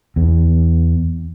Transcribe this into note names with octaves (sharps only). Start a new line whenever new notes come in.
E2